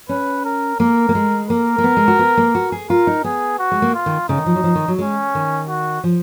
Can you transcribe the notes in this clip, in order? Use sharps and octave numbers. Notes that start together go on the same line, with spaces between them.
C#4 B4
A#4
A#3 A#4
A#3
G#3
A#3 A#4
A#3
B3
G#3
F#4
B3
A#3
F#4
G#4
F4 A#4
D#4
B3 G#4
F#4
G#3
A#3
F4
D#3
C#3 D#4
D#3
F3
F#3
F3
D#3
F#3
G#3 C#4
D#3
F#4
F3